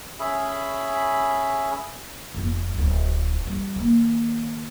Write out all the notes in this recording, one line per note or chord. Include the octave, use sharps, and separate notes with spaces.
C#4 G#4 E5 B5
F1 B3
D1 G1
G3
D#3 A#3